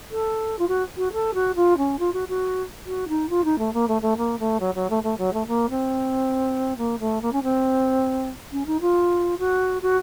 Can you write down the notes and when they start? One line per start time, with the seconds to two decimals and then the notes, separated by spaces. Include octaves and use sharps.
0.11 A4
0.58 F4
0.68 F#4
0.97 F#4
1.13 A4
1.34 F#4
1.55 F4
1.77 C#4
1.99 F4
2.13 F#4
2.28 F#4
2.86 F#4
3.08 D#4
3.29 F4
3.44 D#4
3.58 A3
3.73 A#3
3.88 A3
4.01 A3
4.17 A#3
4.39 A3
4.60 F#3
4.74 F#3
4.90 A3
5.03 A3
5.17 F#3
5.33 A3
5.47 A#3
5.69 C4
6.77 A#3
6.99 A3
7.21 A#3
7.32 C#4
7.43 C4
8.52 C#4
8.66 D#4
8.80 F4
9.38 F#4
9.82 F#4